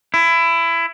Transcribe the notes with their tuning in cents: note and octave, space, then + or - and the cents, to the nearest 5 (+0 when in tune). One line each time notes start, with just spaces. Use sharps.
E4 +20